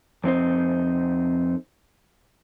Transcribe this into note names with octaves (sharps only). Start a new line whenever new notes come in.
F2 C4 D#4 C5